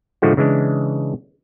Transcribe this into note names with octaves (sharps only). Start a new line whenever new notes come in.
A2 D3 F3 G#3 A3 F#4
C#3 E3 G#3 D4